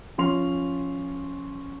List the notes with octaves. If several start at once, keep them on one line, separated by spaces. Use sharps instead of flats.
F3 C#4 C6 F7